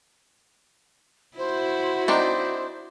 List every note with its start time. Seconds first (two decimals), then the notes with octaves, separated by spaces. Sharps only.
1.38 E4 F#4 C5
2.08 C4 D4 D#4 C5